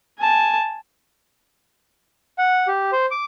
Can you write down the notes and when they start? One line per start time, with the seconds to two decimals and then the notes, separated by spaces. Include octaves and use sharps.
0.19 G#5 A5
2.38 F#5
2.67 G4
2.92 C5
3.11 D6